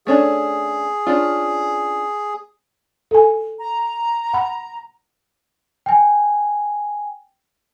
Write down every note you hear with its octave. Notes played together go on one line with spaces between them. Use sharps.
A3 C#4 D4 G#4
C#4 D4 F4
A4 G#5
A#5
F#5 B5
G5 G#5